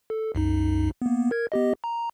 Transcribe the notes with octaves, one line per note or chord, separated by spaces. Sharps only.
A4
C2 F#2 D#4
A#3 B3
A#4 G#6
B3 G4 D#5
A#5